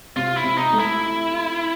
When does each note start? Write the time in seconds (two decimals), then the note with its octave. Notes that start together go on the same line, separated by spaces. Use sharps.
0.16 C3 F4
0.37 E4
0.44 C3
0.58 D#4
0.73 A3
0.79 E4